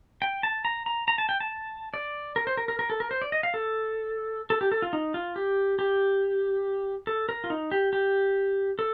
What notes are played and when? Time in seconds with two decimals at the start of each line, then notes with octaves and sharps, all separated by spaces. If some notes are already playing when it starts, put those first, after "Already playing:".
0.22 G5
0.43 A5
0.65 A#5
0.86 A#5
1.08 A#5
1.18 A5
1.29 G5
1.40 A5
1.94 D5
2.36 A#4
2.47 C5
2.57 A#4
2.68 A#4
2.79 A#4
2.90 A4
3.00 A#4
3.11 C5
3.22 D5
3.32 D#5
3.43 F5
3.54 A4
4.50 A4
4.61 G4
4.72 A4
4.82 F4
4.93 D#4
5.14 F4
5.36 G4
5.79 G4
7.07 A4
7.29 A#4
7.44 F4
7.50 D#4
7.71 G4
7.93 G4
8.79 A4